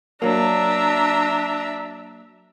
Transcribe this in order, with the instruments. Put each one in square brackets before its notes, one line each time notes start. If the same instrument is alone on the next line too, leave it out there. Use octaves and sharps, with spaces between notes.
[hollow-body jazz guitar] F#3 A#3 [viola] D4 E5 [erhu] A#5